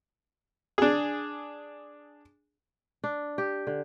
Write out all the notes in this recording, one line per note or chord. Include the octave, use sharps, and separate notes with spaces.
D4 G#4
D4
G4
D3